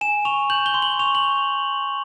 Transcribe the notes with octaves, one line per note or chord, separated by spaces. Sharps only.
G#5 E7
C#6 F7
G6 F#7
G7
C6
F#7
C#6 F7
F#7